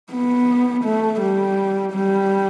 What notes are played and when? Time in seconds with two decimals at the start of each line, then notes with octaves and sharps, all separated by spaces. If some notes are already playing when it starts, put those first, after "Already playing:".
0.12 B3
0.84 A3
1.20 G3
1.93 G3